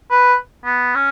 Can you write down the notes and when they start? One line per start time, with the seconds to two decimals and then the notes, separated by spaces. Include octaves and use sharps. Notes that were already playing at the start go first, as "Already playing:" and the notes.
0.11 B4
0.65 B3
0.95 C#4